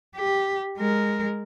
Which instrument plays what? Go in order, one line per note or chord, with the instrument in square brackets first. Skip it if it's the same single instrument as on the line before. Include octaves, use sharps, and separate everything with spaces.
[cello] G4
G#3 A#4